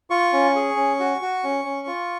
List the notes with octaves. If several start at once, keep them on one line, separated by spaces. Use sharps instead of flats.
F4 C#6
C#4
G#4
C#4
F#4
F#4
C#4
C#4
F4